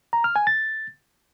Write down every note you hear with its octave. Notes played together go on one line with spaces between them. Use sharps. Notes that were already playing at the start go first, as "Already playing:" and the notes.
A#5
F6
G#5
A6